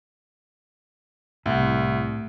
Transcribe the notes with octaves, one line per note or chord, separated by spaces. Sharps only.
C2 A2